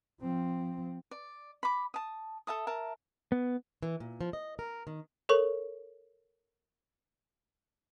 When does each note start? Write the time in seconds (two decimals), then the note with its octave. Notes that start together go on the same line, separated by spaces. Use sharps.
0.21 F3 C4
1.11 D5
1.63 B5 D6
1.94 A5 D#6
2.47 A4 E5 A5 D#6
2.67 A#4 E5 A5
3.32 B3
3.83 E3
4.00 A#2
4.21 F3
4.33 D#5
4.59 A#4
4.87 D#3
5.29 A4 A#4 C#5 C#6 F#7